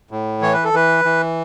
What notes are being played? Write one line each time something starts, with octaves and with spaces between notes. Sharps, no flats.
A2
E3 C#5
B4
A4
E3 B4
E3